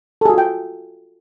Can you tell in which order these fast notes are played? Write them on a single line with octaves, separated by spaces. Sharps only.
A4 G#4 F#4 F4 G5